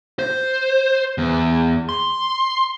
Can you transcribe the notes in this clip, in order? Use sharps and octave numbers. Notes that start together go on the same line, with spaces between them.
C5
E2
C6